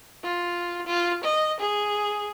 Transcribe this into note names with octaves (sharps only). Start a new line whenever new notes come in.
F4
F4
D#5
G#4